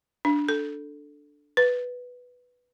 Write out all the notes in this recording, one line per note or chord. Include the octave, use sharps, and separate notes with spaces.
D4
A4
B4